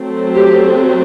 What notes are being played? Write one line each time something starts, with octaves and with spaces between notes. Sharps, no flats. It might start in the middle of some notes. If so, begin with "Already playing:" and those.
Already playing: F#3 A3 C4
G4